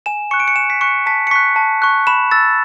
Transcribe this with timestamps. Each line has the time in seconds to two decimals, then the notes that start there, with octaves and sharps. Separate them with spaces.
0.06 G#5 E7
0.31 C#6 F#6 C#7
0.40 D7
0.48 C#7
0.56 G#5 E7
0.70 B6
0.81 C#6 F#6 C#7
1.06 A5 B6
1.27 C#7
1.31 C#6 F#6 B6
1.56 A5
1.82 C#6 F#6
2.07 B5 E7
2.31 E6 A6